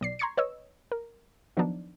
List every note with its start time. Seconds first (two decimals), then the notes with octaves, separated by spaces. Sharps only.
0.01 B1 D5 C7
0.19 A#5 C6 C#6 G#6 C7 C#7
0.37 B4 C#5 D#5 E6
0.92 A#4
1.57 D#3 F3 F#3 B3 D4 D#4